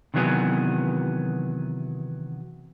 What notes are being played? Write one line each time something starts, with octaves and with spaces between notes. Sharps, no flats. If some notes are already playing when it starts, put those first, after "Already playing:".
C3 D#3 E3 F#3 B3 G#4